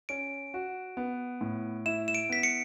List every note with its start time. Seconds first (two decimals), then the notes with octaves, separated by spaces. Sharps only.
0.09 C#4 D7
0.54 F#4
0.97 B3
1.41 A2
1.86 E4 E7
2.08 E7
2.15 D7
2.29 B3 B6
2.43 C#7